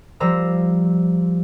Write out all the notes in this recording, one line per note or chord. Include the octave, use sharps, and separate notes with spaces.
F3 G3 C5 A#5 E6